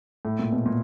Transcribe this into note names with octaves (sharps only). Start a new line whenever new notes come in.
A2
A#2
B2
A#2